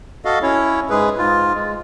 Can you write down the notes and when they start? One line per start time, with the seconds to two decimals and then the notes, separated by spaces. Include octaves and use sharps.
0.25 F#4 A4 D#5 F5
0.42 C#4 E4 C#5
0.90 G#2 G#3 G#4 B4
1.18 G#2 F4
1.55 G#3